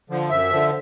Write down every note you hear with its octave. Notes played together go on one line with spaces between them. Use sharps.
D3 F3
F#2 E5
D3 F3